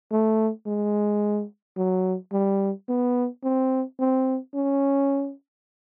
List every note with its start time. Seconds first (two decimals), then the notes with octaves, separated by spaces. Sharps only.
0.12 A3
0.66 G#3
1.77 F#3
2.32 G3
2.89 B3
3.44 C4
3.99 C4
4.55 C#4